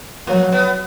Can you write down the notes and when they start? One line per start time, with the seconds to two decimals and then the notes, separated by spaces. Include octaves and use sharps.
0.27 F#3 A#3
0.52 B3